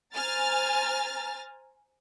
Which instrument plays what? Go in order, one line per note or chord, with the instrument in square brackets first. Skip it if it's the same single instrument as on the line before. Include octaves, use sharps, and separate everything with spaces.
[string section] C5 G#5 A#5 F6 A6